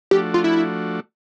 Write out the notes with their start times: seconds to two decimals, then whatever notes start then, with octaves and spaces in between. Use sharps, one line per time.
0.11 F3 A3 D4 F#4 G4
0.34 F4
0.44 E4